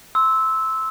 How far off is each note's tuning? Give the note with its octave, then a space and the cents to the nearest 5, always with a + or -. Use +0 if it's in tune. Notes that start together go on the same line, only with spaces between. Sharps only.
C6 +0 E6 -15